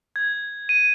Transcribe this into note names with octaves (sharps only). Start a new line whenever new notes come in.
G#6
D#7